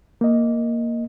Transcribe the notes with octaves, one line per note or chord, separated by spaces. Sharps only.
A#3 D#5